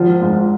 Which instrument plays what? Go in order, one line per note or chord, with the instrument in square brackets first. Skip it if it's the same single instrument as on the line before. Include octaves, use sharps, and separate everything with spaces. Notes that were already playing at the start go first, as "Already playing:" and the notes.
Already playing: [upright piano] G#1 [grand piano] F3
[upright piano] G#2 G#3 F4